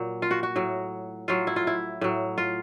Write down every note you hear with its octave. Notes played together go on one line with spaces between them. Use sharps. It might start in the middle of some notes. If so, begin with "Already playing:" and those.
Already playing: A#2 F#3
F4
F#4
F#4
A2 F#3
A2 F#3 F4
E4
F4
E4
A2 F#3
F4